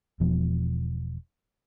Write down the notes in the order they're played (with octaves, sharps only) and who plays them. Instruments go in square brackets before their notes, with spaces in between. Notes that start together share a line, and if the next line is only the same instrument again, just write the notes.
[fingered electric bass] E1 B2 F3